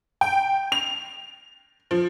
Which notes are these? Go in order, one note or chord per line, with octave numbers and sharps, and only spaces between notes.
G5
F7
F3